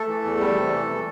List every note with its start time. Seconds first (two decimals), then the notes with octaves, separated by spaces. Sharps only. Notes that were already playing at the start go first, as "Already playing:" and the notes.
Already playing: A3 A4
0.08 E3
0.24 E2
0.40 G3
0.57 C3
0.72 E3